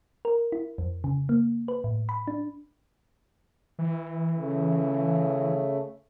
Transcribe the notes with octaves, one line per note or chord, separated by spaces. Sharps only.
A#4
E4
F2
C#3
A#3
B4
A2
B5
D4
E3
C#3 A3